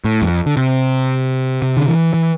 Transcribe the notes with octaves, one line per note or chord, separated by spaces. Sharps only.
A2
F2
D3
C3
C3
D3
E3
E3